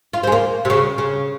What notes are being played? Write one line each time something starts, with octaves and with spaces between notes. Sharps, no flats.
F4
C4
G#3
A#3
C3
C#3
C#3